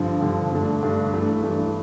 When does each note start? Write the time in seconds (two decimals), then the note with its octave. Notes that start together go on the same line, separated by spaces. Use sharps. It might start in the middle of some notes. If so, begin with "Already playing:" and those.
Already playing: G2 D3 F3
0.21 G2 D3 F3
0.52 G2 D3 A3 D4
0.82 G2 D3 A3 D4
1.12 G2 E3 A3 D4
1.43 G2 E3 A3 D4